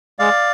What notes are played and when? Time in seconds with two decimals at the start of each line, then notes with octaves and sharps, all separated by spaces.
0.19 G#3 D5 F5